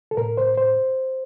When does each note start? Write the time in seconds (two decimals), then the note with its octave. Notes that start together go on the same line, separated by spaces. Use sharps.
0.11 A4
0.17 A2 A#4
0.37 C5
0.57 C5